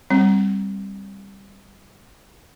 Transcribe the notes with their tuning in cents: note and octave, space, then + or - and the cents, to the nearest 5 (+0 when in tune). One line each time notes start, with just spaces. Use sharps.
G3 +10 C4 +10